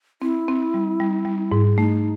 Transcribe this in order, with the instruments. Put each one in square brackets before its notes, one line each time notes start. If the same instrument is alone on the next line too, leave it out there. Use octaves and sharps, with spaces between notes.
[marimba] C4 [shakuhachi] E4
[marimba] C4
G3
G3
G3
G#2
[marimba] A3 [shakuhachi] D#4